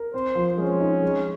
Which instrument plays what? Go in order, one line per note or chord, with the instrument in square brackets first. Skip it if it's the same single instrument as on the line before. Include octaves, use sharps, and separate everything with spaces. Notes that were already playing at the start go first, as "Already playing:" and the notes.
Already playing: [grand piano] A#4
[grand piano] C4 [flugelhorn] C5
[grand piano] F3
[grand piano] G#3 [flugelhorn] C#4
[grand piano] D#4
G#3